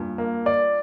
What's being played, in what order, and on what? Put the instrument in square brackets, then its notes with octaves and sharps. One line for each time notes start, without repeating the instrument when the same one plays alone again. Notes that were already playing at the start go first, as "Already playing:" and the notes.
Already playing: [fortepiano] G2 A#2
[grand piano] A#3
D5